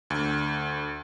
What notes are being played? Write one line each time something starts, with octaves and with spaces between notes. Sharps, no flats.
D2